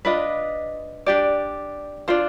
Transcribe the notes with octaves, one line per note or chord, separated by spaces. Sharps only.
D4 F4 B4 D#5
D4 G4 D5
D4 F4 C5